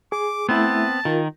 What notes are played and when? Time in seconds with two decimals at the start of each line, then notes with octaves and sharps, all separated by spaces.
0.12 G#4 D6
0.49 A3 B3 C4 E4 E5 A5
1.05 D#3 F4 A#4